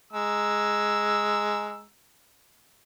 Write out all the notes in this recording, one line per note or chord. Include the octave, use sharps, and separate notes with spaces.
G#3 A#5 E6